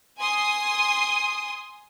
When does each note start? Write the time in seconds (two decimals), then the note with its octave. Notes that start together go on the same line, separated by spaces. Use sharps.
0.19 G#5 C6 D#6